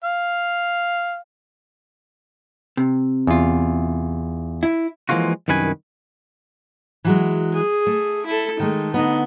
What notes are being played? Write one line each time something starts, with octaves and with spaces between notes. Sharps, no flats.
F5
C3
E2 F4
E4
E3 F3 G#3 A#3 F4 F#4
C2 F#2 D#3 B4 G#5
E3 F#3 G#3
G#4
A3
E4 A4
D#3 G#3 A3
D3 B3 D#4